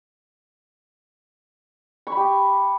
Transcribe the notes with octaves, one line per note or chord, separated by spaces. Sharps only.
C#6
B5
G4